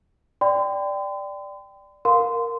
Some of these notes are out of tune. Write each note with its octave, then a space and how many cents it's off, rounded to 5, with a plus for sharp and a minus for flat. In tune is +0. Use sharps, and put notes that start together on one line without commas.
D5 +0 G5 +0 C6 -45
A#4 +0 F5 +25 C6 -20